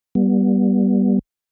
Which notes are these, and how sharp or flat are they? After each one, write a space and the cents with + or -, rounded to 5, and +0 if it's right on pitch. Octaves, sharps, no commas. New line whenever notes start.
G3 +0 B3 -25